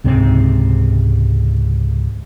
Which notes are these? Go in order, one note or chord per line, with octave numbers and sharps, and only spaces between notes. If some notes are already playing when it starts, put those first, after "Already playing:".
C#2 G#2 C3 C4